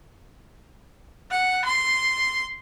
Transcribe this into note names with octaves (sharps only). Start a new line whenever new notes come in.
F#5
C6